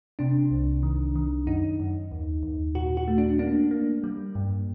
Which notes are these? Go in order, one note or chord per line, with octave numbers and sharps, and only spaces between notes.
C3 D4
C2
D#3
D#3
F#2 D#4
F#2
D#2
D#2
A#2 F#4
F#4
A3
D4
A#3 D4
A#3
G3
G2